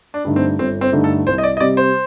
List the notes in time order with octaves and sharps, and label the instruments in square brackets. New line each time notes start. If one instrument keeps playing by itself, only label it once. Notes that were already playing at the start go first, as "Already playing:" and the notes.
[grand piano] D4
[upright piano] G2 D3 A3 D#4
[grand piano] C4
[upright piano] G1 [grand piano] C4
[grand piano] C4
[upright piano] G2 D3 A3 D#4
[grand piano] A4
[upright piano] C2 [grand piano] C5
[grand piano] D#5
D5
D#5
[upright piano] C3 G3 [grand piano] D5
[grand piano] C5